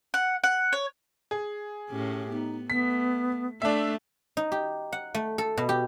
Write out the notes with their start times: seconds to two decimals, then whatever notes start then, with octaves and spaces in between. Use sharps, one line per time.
0.14 F#5
0.44 F#5
0.73 C#5
1.31 G#4
1.89 A2 C#4 G4
2.31 B3 D#4
2.70 A3 B3 B6
3.62 A3 D4 E5
4.37 D#4
4.52 G4
4.92 F#5
5.15 A3
5.38 A4
5.57 B2
5.69 G4